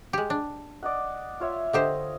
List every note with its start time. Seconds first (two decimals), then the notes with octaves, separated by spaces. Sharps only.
0.13 G#3 G4
0.30 D4
0.83 D5 D#5 F#5
1.40 F4 C#5 E5
1.73 D3 G4 C5 D#5